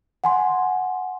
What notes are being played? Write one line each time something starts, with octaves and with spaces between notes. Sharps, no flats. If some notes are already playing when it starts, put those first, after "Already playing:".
F#5 G#5 C6